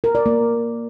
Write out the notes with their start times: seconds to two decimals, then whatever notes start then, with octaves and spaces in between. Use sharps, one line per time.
0.04 A#4
0.15 D5
0.26 A#3